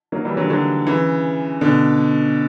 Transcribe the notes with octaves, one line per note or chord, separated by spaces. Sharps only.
F#3 A#3
E3 G3
D3 F#3
D3 F#3
C#3 E3
B2 D3